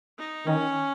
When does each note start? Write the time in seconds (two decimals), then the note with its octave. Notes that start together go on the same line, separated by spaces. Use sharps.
0.19 D#4
0.46 D#3 C#4